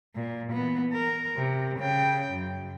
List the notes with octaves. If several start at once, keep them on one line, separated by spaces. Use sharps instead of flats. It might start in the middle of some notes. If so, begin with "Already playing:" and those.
A#2
E3 B3
A#4
C3
C#3 G5
F#2